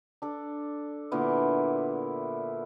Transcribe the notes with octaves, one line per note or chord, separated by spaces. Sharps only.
D4 A4
A#2 D3 B3 E4